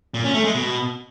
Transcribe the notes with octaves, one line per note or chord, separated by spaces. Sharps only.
A#2
C#4
A3
G#3
B2